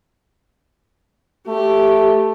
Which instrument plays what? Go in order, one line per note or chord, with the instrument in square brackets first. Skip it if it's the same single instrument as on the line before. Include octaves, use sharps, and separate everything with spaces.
[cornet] A3 [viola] G4